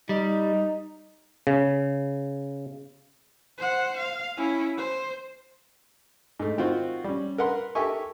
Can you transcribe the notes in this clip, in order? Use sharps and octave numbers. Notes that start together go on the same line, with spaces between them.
G3 D#4
C#3
C5 F#5
F5
C#4 E4
C5
G#2 A3
D#3 C4 F4 F#4 C5
G3 C#4
A#4 B4 F#5 C6
G4 A4 A#4 E5 G#5 C#6